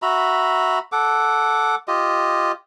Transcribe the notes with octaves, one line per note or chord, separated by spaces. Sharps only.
F#4 E5 A#5 B5
A4 F#5 D6
F4 G4 D#5